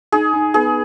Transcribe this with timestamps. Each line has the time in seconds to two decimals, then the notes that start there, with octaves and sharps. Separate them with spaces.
0.12 D#4 G#4
0.33 D#4
0.54 B3 G#4